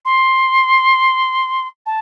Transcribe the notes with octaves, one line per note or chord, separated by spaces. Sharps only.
C6
A5